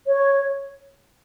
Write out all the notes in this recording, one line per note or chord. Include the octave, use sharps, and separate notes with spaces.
C#5